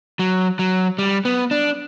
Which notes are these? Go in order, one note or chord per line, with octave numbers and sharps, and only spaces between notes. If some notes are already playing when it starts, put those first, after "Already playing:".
F#3
F#3
G3
B3
D4